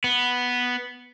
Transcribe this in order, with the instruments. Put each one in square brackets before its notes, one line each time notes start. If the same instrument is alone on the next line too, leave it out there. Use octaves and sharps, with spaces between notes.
[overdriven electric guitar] B3